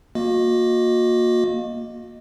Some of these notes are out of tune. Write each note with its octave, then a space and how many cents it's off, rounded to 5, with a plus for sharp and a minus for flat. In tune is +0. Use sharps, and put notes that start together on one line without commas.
A#3 +5 F#4 -40 D#5 +0